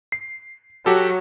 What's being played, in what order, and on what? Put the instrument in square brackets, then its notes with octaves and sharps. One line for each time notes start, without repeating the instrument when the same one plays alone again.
[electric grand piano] C7
[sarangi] F#3 [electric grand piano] F#4 G4 A4